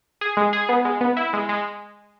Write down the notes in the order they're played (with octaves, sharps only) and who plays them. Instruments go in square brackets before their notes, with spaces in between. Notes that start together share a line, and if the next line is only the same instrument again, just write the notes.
[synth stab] G#4
G#3
G#4
B3
G#3
B3
E4
G#3
G#3